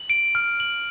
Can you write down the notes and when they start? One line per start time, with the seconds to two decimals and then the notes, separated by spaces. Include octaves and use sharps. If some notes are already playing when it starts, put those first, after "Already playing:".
Already playing: F#7
0.10 D7
0.35 F6
0.60 F#7